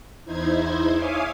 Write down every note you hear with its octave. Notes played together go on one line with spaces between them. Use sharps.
E2 D#4 E4 C5 G#6
C#5 E5 F5 G#5 D6 D#6